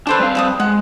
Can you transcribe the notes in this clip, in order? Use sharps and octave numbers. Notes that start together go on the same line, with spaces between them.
D4 A4 B4 C5 A5
G3 C4 F5
B4 A5 D#6
G#3 F#5